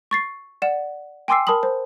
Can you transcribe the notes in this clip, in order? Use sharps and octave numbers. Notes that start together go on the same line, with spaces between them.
C#6 A6 C7
D5 F#5 E7
G5 G#5 C6 D6 E6 C7
A#4 A5 B5 D#6 F#7
C5